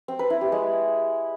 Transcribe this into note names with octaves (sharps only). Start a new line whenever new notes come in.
C4
B4
E4
G4
G#3